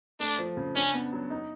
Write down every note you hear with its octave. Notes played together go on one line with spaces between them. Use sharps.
A3 D4
F3
C#3
C#4 D4
B3
F#3
D#4